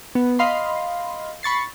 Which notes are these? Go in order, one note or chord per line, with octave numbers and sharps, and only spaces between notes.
B3
D#5 F5 B5 C6
B5 C#6 A6 C7